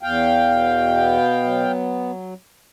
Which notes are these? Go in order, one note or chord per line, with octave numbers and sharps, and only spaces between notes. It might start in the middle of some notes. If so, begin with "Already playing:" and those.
E2 F5 G5
B2
B3
F#3